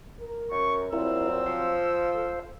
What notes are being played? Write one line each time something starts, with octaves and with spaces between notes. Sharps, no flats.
A#4
F#2 C#6
G2 A#2 F#3 C4 E4 A#4 E6
F3 C5 F5
A4